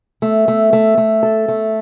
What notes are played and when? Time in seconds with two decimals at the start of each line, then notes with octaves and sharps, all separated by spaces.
0.22 A3
0.48 A3
0.73 A3
0.98 A3
1.23 A4
1.48 A3